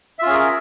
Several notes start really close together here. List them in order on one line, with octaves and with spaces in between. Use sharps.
E5 F4 C#4 G#4 A#4